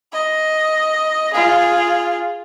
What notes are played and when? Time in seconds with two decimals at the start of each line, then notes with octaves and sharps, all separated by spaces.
0.13 D#5
1.34 F4 G#4